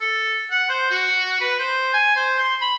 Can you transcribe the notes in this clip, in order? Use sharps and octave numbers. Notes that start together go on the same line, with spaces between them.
A4
F#5
C5
F#4
B4
C5
G#5
C5
C6
B5